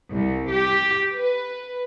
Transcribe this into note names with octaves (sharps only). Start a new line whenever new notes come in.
C2
G4
B4